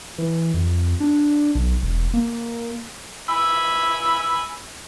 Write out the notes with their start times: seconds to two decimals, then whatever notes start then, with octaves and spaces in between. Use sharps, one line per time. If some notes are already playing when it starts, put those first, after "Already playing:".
0.18 E3
0.54 F2
1.00 D4
1.55 B1
1.83 E1
2.14 A#3
3.29 G#5 B5 E6